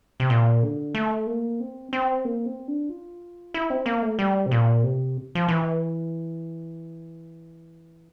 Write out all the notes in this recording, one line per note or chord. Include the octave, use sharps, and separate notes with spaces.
C3
A#2
D3
A3
A#3
C4
C4
A#3
C4
D4
F4
E4
C4
A#3
A3
G3
C3
A#2
C3
F3
E3